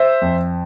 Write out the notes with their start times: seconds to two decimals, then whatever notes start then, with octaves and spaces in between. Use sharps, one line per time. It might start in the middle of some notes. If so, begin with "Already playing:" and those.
Already playing: C5 E5
0.22 F2